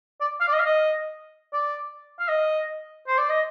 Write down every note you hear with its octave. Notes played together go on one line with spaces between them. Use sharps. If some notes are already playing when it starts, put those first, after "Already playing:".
D5
F5
D5
D#5
F5
D#5
D5
F5
D#5
C5
D5
D#5